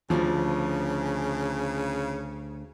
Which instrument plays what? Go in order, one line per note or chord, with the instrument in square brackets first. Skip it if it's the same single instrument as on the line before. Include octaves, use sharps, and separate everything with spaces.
[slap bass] D2 [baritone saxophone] C#3 [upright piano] F3